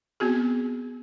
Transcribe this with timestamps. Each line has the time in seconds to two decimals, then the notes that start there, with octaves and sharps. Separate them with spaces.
0.20 B3 C4 F#4 G#4